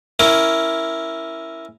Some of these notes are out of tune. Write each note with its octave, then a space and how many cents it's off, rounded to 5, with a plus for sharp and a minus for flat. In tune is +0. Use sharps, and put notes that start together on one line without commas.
C#4 +0 E4 +0 A#4 +0